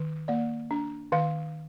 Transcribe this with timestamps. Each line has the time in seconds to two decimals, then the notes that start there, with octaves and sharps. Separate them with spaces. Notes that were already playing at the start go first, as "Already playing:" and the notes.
Already playing: D#3
0.28 A#3 D5
0.71 D4
1.12 D#3 F5